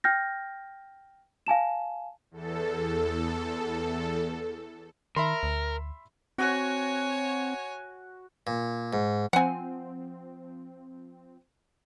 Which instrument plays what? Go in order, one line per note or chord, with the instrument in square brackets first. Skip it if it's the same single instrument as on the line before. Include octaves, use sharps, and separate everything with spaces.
[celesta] G5 F6 G6 A#6
F5 G#5 A5 E7
[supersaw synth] E2 A4
[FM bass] D#3 [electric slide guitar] A#4 [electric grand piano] E5 B5 C6
[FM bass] D2
[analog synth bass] C4 [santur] F#4 F#5 [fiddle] C#5 G#5
[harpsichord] A#2
G#2
[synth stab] F3 C4 [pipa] F#5 G#5